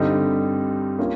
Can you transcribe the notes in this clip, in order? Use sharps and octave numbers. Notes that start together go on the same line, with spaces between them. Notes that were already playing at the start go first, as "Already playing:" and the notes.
Already playing: G2 D3 G3 C4 D#4
A#3 C#4 F4